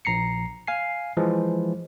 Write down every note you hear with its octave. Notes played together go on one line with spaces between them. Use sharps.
A#1 A#5 C7 C#7
F5 G#5 C7
E3 F3 G#3